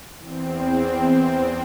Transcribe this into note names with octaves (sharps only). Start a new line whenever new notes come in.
E2 C4